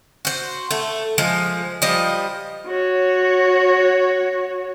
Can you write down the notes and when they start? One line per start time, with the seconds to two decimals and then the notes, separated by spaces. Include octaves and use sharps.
0.25 F#4 C5
0.71 A3
1.18 F3 G#3
1.82 F3 G3 D#5
2.67 F#4 C#5